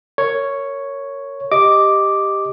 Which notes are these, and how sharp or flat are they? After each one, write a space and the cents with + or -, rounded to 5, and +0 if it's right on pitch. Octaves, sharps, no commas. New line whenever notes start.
A#4 -20 C#5 +0
G4 +5 D#5 +0 D6 +0